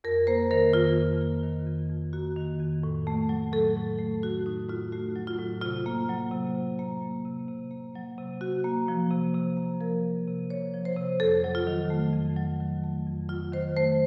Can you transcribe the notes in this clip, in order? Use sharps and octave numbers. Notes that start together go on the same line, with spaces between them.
F2 A#4
A#3 C5
D#3 A#4
F2 F4
F2
A#3
D#3
F2
F2
A#3 F#4
D#3
F2
A2
A3
F#3
A2 A4
A2
A3
F#3 F#4
A2 D#4
A2 F4
A3 F#4
F#3
F4
A2
C3 F4
A#3
F#3
C3
C3
A#3
F#3
C3
C3
A#3
F#3
C3
C3 F#4
A#3
F3
C3
C3
A#3
F3 A#4
C3
C3
A#3 C#5
F3
C5
C3
F2 A4
F#3
F4
D#3
A3
F2
F#3
D#3
A3
F2
F#3 F4
D#3 C5
A3 C5